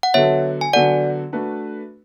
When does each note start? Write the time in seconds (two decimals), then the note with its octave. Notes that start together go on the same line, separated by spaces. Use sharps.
0.03 F#5
0.14 D3 F#3 B3 F#4 A4 C#5 E5
0.61 G#5
0.73 D3 F#3 B3 F#4 A4 D5 F#5
1.33 A3 D4 F#4 B4